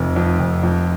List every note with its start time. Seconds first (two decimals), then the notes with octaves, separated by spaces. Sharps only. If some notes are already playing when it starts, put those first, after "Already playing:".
Already playing: F1 F2
0.16 F2
0.39 F1
0.63 F2